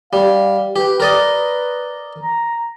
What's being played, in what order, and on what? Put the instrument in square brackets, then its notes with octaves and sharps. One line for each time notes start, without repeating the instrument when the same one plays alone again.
[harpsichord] G3 [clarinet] F5
[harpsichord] G4 [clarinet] B4
[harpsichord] A#4 D5 D#5
[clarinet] A#5